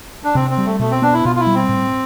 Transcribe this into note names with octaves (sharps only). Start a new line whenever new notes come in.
D4
C3 C4
C4
G3
A3
B2 A3
C4
B3 D4
E4
B2 F4
F4
E4
G3
C4
A2